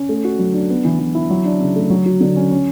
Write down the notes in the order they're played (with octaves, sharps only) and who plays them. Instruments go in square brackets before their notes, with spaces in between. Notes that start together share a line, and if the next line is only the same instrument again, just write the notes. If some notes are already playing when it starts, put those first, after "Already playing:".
Already playing: [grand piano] C#4
A3
F#4
F#3
D4
B3
E3
E3
E4
F#3
D4
C#3
A3
F#3
F#4
D3
C#4
C#4